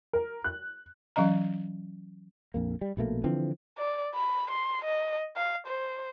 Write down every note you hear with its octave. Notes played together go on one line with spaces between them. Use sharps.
A#4
F#6
E3 F#3 C#4 D#5 A#5
A#1 F2 A#3
G3
A#1 B2 A3 A#3
D3 E3 F3 C4
D5
B5
C6
D#5
F5
C5